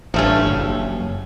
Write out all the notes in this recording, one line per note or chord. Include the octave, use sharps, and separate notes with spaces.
A1 G2 F3 A3 C#4
F#1